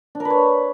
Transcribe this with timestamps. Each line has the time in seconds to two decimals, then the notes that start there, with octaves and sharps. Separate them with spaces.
0.15 D4
0.20 A#4
0.25 B4
0.30 C#5